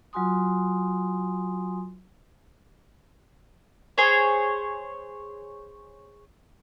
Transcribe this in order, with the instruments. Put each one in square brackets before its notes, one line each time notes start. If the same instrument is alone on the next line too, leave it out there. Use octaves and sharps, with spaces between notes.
[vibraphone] F#3 F4 F#4 G#5 C6 D#6
[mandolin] G#4 C5 C#5